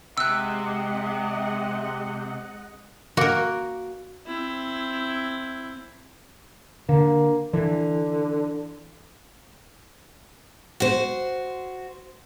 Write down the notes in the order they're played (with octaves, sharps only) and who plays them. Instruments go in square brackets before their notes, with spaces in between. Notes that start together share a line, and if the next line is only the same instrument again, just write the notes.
[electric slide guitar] C3 [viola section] G#3 D#5 F#5 [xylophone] E6 F#6
[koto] A#3 A#4 [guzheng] F#4
[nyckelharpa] C4 E4
[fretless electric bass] D3 [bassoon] A#3
[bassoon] D3 [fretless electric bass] E3
[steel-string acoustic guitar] F#4 C5